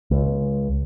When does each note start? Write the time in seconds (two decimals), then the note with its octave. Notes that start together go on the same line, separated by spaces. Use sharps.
0.11 C#2